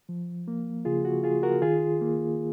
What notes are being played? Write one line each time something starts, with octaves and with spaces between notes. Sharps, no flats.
F3
A#3
C#3 F4 G#4
F#4
F4 G#4
F#4 A#4
D#3 F4 G#4
A#3